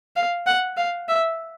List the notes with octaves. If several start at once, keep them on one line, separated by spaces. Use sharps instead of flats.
F5
F#5
F5
E5